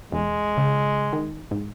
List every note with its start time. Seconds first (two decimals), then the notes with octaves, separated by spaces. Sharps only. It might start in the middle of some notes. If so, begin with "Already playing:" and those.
0.12 E1 G#3
0.57 C#3
1.13 D#3
1.51 G#2